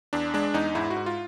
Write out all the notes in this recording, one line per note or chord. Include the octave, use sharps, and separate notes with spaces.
E2 D4
G#3 D4
E2 D#4
G#2 E4
F#4
G#2
F4